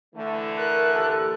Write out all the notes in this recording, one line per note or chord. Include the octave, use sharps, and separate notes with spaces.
D3 E3 A3
A#4 F#6
G4 A4